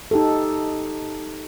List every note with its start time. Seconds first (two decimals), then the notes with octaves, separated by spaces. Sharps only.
0.11 D#4 G4 A4